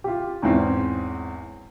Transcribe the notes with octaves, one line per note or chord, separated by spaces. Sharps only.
F4 G4
E2 G#2 E3 C4 C#4